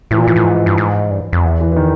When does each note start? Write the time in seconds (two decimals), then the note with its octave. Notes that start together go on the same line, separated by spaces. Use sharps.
0.11 A2 E3
0.18 A#2 F3
0.25 A2 E3
0.36 A2
0.44 G#2
0.66 G2
0.78 G#2
1.10 G2
1.33 F2
1.44 E2
1.61 E3
1.72 E3
1.76 D#3